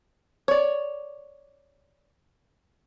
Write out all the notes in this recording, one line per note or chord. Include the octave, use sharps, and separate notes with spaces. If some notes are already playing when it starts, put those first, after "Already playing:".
C#5 D5